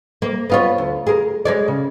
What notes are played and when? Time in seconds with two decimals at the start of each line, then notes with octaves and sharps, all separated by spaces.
0.22 A#3
0.50 B3 F4 C#5
0.78 D2
1.07 G#4 A#4
1.45 G#3 C#5 D5
1.68 C#3